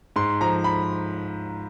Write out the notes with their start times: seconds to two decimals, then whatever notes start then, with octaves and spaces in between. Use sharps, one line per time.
0.16 G#2 C6
0.41 F3 A#5
0.64 B5